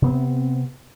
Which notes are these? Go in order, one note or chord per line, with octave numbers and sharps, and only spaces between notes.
C3 B3 C4